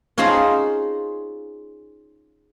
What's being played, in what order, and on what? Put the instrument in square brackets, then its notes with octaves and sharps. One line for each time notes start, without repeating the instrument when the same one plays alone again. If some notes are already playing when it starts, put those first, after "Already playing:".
[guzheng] C#4 D#4 F4 G#4 C5 A#5